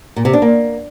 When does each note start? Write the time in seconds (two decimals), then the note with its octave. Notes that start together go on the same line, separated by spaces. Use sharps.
0.16 A#2
0.25 C3
0.33 D4
0.42 A#3